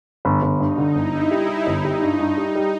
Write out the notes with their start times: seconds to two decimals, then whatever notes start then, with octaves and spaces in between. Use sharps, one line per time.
0.25 G1
0.42 G1
0.60 G2 D#4
0.78 D3
0.95 G1 E4
1.13 G2
1.31 G3
1.49 G3
1.67 G1 D#4
1.84 G3
2.02 G2
2.19 G2
2.37 G3
2.55 G3